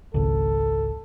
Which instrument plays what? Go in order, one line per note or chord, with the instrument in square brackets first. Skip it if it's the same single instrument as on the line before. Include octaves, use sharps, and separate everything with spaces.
[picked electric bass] G#1 C#2 [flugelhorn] A4